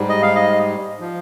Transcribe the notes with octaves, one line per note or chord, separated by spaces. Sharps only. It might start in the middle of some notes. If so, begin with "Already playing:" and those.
Already playing: G#2 G3
D#5
F5
D#5
F3